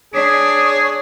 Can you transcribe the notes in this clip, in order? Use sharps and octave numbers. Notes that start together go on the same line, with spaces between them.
D4 G#4 C#5